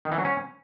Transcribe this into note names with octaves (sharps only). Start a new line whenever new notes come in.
D#3
E3
F#3
C#4